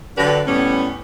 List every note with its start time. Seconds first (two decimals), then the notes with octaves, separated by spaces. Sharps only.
0.17 D3 F#3 D4 G4 B4
0.47 A2 G3 B3 C#4